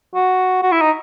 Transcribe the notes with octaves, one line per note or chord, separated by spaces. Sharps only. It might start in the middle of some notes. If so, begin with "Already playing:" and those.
F#4
F#4
E4
D#4